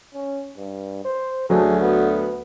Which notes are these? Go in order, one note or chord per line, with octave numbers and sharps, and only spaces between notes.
C#4
G2
C5
D2 F#3 A3 G#4
B3